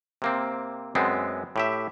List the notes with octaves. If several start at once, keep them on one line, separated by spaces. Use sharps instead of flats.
C3 A#3 C4
F#2 G#3 B3 C4
A2 G4 E5